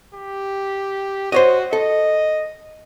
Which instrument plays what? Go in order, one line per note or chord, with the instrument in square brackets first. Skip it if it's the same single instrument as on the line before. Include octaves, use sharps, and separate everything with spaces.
[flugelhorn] G4
[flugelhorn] F#4 [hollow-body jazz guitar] C5 C#5 D#5
[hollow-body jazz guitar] A4 [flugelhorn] D#5